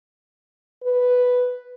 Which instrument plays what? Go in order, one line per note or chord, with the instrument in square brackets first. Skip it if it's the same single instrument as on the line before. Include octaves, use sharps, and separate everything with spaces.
[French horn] B4